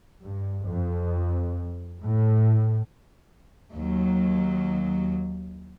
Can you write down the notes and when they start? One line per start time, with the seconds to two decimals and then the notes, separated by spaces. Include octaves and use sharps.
0.23 G2
0.67 F2
2.02 A2
3.73 D#2 F#3